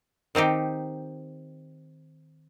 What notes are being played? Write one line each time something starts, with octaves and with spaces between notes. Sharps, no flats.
D#3 C4 D#4 G4